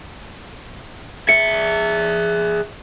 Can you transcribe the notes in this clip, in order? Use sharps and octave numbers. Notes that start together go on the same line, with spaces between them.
G#4 E5 C#7